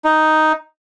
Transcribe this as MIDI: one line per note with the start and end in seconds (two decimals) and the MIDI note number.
0.05 0.53 63